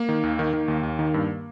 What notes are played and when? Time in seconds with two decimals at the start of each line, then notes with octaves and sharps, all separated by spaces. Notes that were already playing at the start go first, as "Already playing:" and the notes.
Already playing: A#3
0.09 D#3
0.23 D#2
0.39 D#3
0.53 D#3
0.68 D#2
0.83 D#2
0.99 D#3
1.14 G2